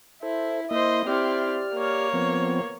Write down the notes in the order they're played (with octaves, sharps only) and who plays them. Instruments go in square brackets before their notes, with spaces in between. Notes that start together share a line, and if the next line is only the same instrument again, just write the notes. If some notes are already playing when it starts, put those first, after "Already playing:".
[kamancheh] E4 [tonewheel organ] A4 C5
[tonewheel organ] A#3 E4 E5 [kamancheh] C5 D#5
[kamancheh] C4 E4 [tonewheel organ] G4 D5 F6
[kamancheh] A#3 C#5
[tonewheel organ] F3 B3 C4